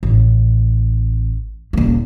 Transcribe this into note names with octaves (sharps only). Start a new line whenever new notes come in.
A1
D#1 A#3